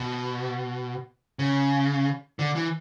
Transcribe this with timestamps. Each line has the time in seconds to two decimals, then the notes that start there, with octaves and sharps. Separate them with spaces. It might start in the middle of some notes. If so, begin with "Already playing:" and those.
Already playing: B2
1.39 C#3
2.39 D3
2.56 E3